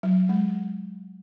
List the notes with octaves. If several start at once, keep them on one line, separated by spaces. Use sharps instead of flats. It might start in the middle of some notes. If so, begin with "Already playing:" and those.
F#3
G#3